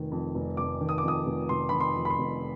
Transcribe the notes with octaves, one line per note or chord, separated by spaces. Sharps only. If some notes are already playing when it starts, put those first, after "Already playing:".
Already playing: F1 D#3
F2
F1
F1 D6
D#3
D#6
D6
F2 D#6
F1
F1 C6
D#3 B5
C6
F2
B5
C6
F1